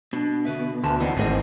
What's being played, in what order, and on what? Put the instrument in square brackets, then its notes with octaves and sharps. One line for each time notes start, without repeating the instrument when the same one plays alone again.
[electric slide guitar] B2 [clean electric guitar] D4
[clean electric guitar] D3 B4 E5
[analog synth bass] D2 [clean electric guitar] G#5 A5 C6
[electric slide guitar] E3 B3 C4 [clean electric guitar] D#5
[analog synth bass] G#1 [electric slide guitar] A2 C4 [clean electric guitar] D#4 G#4 D#5